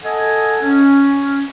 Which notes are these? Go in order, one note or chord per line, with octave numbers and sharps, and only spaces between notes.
A4 D#5 F#5 G#5 A5
C#4